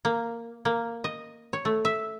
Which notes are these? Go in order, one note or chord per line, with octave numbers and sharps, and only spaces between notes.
A#3
A#3
D#5
C#5
A3
E5